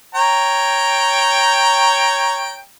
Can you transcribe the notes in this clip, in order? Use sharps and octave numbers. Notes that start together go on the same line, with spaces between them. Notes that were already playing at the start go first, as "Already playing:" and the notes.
C#5 G5 A#5